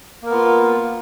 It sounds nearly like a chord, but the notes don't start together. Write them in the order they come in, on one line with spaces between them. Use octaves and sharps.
A#3 A#4 B3 F4